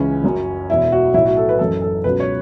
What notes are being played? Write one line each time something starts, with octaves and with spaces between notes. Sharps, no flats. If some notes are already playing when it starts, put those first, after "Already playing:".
Already playing: C#2 C#3 E3 C#4
F#1 F#2 F#3
E1 E2 B2 E4
F#4
B1 A2 F#3 E4
F#4
A4
B4
F#1 F#2 E3 A4
A4
C#2 B2 F#3 B4
C#5